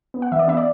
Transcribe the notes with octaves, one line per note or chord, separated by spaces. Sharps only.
B3
F#5
E3 E5
D5
B3 E5
D5